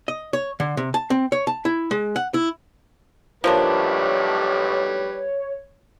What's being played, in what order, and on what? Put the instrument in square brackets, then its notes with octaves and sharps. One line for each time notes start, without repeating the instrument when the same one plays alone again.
[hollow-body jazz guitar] D#5
C#5
D3
C3
A5
C4
C#5
A5
E4
G#3
F#5
E4
[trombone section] B1 A2 [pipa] F3 A#3 D4 [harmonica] G3 B4 [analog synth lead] C#5